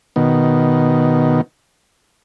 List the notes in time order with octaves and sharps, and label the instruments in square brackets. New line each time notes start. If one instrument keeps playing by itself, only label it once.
[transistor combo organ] B2 D#3